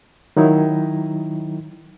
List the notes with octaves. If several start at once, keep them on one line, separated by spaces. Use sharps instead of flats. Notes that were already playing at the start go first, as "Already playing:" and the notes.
D#3 F#3 D#4 E4